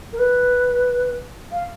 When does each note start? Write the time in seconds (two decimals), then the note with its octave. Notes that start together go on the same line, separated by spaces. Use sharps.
0.13 A#4
0.19 B4
1.52 F5